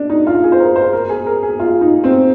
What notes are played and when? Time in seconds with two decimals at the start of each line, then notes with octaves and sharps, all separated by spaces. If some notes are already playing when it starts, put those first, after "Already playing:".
Already playing: D4
0.10 D#4
0.27 F4
0.43 G#4
0.52 C5
0.60 A#4
0.76 C5
0.93 A#4
1.09 G#4
1.26 A#4
1.43 G#4
1.60 F4
1.81 D#4
2.04 C4